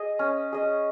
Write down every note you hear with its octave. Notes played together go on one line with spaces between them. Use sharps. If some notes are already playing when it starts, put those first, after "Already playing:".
Already playing: G#4 D#5
C#4
G#4 D#5